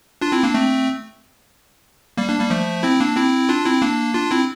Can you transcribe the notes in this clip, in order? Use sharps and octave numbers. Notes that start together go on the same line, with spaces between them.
D4 F4
C4 E4
A#3 D4
A3 C4
G3 A#3
A#3 D4
G3 A#3
F3 A3
C4 E4
A#3 D4
C4 E4
D4 F4
C4 E4
A#3 D4
D4 F4
C4 E4